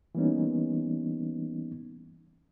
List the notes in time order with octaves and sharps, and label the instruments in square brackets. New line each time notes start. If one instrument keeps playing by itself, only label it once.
[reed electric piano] E3 G3 A#3 B3 C#4 D#4